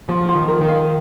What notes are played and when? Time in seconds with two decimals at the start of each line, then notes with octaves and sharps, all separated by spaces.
0.09 F3 F4
0.29 F4
0.35 D#3
0.48 A#4
0.61 D#3
0.69 F5